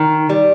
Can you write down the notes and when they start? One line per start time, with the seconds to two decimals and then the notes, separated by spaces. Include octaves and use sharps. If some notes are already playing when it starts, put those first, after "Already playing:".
Already playing: D#3
0.29 G3